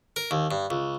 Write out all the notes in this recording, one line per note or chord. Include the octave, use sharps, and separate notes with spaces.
A#4
D#2
G2
C#2